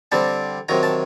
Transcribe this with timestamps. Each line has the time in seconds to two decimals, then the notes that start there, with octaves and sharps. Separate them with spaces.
0.12 D3 G3 C4 A5
0.69 C3 D#3 F#3 A#5
0.83 A5